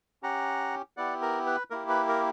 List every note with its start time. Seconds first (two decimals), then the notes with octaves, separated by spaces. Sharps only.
0.23 C#4 G4 F#5 A#5
0.97 B3 E4 G4 D5 F#5
1.22 A#4
1.46 B4
1.70 A#3 E4 G4 A#4
1.89 B4
2.08 A#4